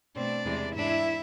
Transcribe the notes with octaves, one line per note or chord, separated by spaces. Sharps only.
B2 A3 C4 D4 D5
E2 C3 E3 G#3
G#2 G#3 D4 E4 E5